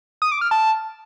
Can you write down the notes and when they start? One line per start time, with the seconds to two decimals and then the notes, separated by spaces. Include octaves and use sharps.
0.22 D#6
0.32 D6
0.41 F6
0.51 A5